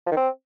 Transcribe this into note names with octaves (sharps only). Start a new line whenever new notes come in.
F3
D#3
C4